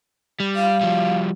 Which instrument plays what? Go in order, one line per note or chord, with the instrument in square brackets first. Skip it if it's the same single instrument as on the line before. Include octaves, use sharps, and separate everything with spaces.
[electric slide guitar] G3
[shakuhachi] F5
[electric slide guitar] F3 G3